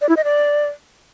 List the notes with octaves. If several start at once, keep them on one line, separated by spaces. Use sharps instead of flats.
D5
E4
D#5
D5